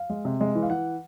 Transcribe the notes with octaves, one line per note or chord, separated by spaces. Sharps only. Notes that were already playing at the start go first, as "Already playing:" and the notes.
Already playing: F5
G#3
C3
G#3
E3
F5
E3 F#5